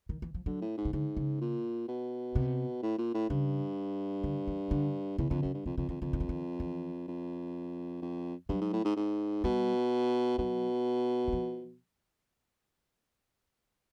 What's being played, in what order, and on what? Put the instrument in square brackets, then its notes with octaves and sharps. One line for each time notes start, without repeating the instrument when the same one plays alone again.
[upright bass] D#3
E3
F3
[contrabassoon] D3 [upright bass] F#3
[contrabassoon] A2
G#2
[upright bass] C#3
[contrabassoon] G#2 [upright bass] D3
[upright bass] C#3
[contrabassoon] A#2
B2
[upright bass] C3
[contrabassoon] A2
A#2
A2
[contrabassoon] G2 [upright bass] C#3
[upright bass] D3
E3
D3
[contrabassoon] E2 [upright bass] C#3
[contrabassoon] F2 [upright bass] D3
[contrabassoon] F#2 [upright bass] C#3
[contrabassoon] G2
[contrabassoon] F2 [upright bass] C3
[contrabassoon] F2 [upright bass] C#3
[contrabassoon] F2 [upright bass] D#3
[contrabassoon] F2 [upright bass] D3
[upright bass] D#3
E3
D#3
E3
[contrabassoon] F2
F2
[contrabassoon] G2 [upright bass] F#3
[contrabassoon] G#2
A2
G#2
G#2
[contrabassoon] B2 [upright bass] G3
[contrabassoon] B2 [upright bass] F#3
[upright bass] F#3
F3